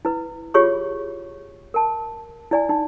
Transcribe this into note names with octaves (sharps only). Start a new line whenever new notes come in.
E4 B4
F4 G4 G#4 C#5 B5 C#6
A#4 A5
E4 D5 G#5
D#4